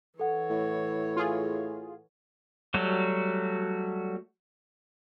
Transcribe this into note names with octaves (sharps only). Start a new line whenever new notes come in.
E3 A4 C#5 F#5
A2
F4 G#4
F#3 G3 A3 F#4